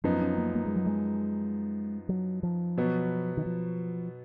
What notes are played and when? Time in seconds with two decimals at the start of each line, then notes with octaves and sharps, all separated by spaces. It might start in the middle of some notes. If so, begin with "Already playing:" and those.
0.04 F#2 F3 B3 C#4 D#4
0.21 C#4
0.38 A#3
0.55 A#3
0.66 G#3
0.76 F#3
0.86 G#3
2.09 F#3
2.43 F3
2.77 B2 F#3 B3
3.37 D#3
3.46 F3